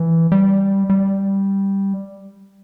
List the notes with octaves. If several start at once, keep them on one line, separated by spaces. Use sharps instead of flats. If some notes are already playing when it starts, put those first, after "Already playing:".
Already playing: E3
G3
G3